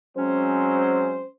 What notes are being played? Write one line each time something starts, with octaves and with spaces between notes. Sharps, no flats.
F#3 G#3 C4 C#4 C5